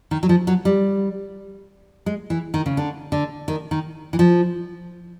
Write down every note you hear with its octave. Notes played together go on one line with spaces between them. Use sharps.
D#3
F#3
F3
F#3
G3
G#3
E3
D#3
C#3
D3
D3
D#3
D#3
E3
F3